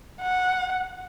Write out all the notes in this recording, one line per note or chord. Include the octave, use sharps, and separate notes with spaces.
F#5